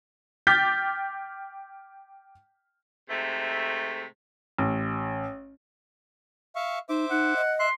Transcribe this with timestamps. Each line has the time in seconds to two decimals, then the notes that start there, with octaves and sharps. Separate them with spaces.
0.47 G5 D6 F6 G6 A6 B6
3.10 G#2 C3 A3
4.58 A1
6.55 E5 F5 C#6
6.89 D#4 C5 E5 D6
7.11 D#4 F#5
7.36 D#5
7.59 E5 C6 F#6